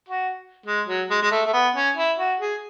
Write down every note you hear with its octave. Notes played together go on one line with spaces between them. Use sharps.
F#4
G#3
F#3
G#3
G#3
A3
A3
B3
C#4
E4
F#4
G#4